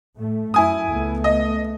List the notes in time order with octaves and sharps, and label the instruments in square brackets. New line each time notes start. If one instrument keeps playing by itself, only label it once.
[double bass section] A2 A3
[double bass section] F#2 [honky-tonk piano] E4 G#5 D#6
[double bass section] C#2 A3 B3
[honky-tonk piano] D#5